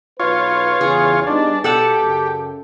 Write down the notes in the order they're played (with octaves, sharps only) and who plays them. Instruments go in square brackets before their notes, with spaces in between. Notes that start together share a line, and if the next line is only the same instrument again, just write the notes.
[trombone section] B1 B4 [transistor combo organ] F4 C#5
[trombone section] E2 C#3 [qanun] G#4
[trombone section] G3 B3 D#4 [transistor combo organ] D4
[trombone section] B2 [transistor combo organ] G4 [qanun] A4 F#5 A5
[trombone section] F#2 C#3